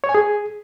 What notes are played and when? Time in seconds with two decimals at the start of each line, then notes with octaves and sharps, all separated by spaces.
0.04 C#5
0.09 G#5
0.15 G#4